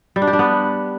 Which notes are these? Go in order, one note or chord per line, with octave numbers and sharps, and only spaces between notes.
G3
D4
G4
D4
B3